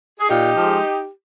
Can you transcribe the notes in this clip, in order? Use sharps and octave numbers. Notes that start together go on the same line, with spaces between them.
G#4
A#2 D#4 G4
F3 G#3